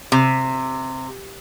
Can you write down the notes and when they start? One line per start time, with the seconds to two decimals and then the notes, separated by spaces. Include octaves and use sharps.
0.12 C3